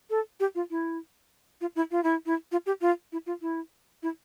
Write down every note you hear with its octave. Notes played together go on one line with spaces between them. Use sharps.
A4
G4
F4
E4
F4
E4
F4
E4
E4
F4
G4
F4
E4
F4
E4
E4